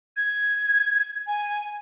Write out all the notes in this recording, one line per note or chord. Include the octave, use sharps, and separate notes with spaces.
G#6
G#5